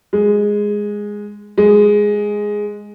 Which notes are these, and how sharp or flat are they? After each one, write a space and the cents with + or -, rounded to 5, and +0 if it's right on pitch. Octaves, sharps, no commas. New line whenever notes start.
G#3 -5
G#3 +0